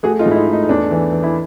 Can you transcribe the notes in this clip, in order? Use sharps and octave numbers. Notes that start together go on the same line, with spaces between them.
A3 F#4 G#4
D#4 F4
G#2
E4
D#4
A3
D#4
D#4
E2 D4
E3
E3
E4